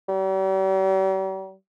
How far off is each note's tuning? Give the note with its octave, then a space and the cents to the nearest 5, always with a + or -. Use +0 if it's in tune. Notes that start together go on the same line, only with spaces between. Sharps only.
G3 -45